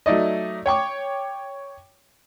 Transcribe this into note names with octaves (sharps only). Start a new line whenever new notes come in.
F#3 A3 D#4 D5 D#5
C#5 G5 C#6 D6